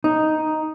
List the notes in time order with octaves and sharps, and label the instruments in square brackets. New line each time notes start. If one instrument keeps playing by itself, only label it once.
[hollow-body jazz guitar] D#4